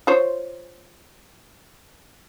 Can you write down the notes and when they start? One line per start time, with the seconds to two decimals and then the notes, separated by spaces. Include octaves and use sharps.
0.07 F4 C5 C#5